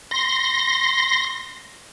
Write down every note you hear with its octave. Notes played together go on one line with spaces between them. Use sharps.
C6 A#6